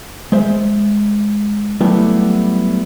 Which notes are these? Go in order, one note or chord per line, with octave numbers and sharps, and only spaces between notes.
G#3 C5 E5
F#3 G3 A3 B3 E4 G4